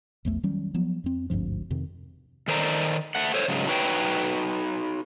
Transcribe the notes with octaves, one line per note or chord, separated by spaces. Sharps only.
A#1 E2 A3
D#3 F#3 G3 C#4
F3 F#3 B3
F2 C4
G#1 D2 G2 F3
F2 C3 D#3
D#3 A4 C5 D5 E5 A#5
A3 F#5
A4 C5 C#5
G#2 C#3 F#3 G#3
D#4 F#4 B4 C#5 G5